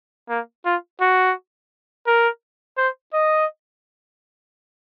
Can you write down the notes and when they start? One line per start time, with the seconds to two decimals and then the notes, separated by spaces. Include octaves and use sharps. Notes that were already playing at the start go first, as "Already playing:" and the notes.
0.29 A#3
0.65 F4
1.01 F#4
2.07 A#4
2.77 C5
3.13 D#5